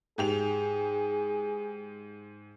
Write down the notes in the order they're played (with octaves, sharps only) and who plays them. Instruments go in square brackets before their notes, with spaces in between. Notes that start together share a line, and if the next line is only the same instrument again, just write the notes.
[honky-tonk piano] G#2 G4 F7 [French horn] G#4